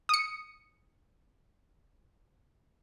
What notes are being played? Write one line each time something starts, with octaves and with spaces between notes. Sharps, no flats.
D#6 C#7